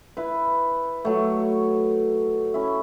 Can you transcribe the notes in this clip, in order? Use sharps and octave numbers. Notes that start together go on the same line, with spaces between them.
E4 B4
F#3 A3
C#4 E4